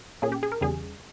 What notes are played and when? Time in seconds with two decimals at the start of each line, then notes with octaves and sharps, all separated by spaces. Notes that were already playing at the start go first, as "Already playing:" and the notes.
0.22 A#2 A#3 C#4 G#4
0.32 G4
0.43 G#4
0.52 A#4
0.61 E2 C#3 G3 G#4